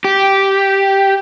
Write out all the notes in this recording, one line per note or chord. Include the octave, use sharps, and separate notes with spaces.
G4